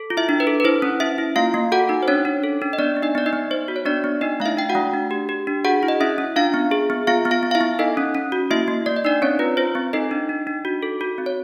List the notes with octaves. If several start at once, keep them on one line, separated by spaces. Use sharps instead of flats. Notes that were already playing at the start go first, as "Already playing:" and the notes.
Already playing: A4
F4
E4 E5
D4
B4
A4
B4
E4 C5
C#4
C#4 E4 E5
E4
A#3 F4 F5
A#3
F#4 A4 F#5
D#4
C5
C#4 D4 C#5
D4
A4
D4
D#5
B3 D4 D5
B3
D#4 D#5
B3 D5
D#4 D#5
B3
B3 C5
F#4
C#5
B3 D4 D5
B3
D4 D#4 D#5
A3 F5
E4 E5
D4 G5
F#4 F#5
A3
D4
G4
G4
D4
F#4 G#4 F#5
E4
D#5
C#4 E4 E5
C#4
D4 F4 F5
B3
G#4
B3
B3 F4 F5
B3
F4 F5
B3
F5
E4 E5
B3
D#4 A4 D#5
C#4
C#4
F#4
A#3 E4 E5
A#3
A#3 D5
D#5
D4 D#4 D5
C4 C#4 C#5
F4 B4
F4 C5
C4
D#4 A4 D#5
D4
D4
D4
F#4
A4
F#4
C4
C#5